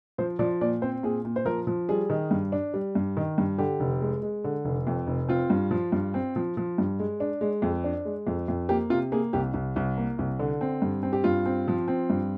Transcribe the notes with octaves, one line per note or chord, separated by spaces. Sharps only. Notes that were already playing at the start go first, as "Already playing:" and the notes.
F3 C5
F3 D5
A#2 D5
C4 C5
A#2 G#4
A#2
C5
F3 A#4
F3
G3 G#4
D#3
G2
D4
G3
G2
D#3
G2
D3 G4
F1
G#3
G#3
D3
F1
F2
F1
C4 F4
G2
F3
G2
C4
F3
F3
G2
G#3
D4
G#3
F2
D4
G#3
F2
F2
A#3 G4
C3 F4
A#3 G#4
C2 G4
C2
C2
A#3
C2
D3
C4
G2
C4
G4
G2 F4
C4
F3
C4
G2